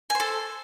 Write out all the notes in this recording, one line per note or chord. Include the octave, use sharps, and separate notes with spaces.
A4 C5 G#5